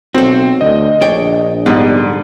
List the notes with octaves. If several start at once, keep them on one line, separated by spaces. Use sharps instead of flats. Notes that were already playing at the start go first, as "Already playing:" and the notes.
B1 C4 F#4 A4
D2 D#5
A#1 D4 C#5 G5
G#2 D3 G3 B3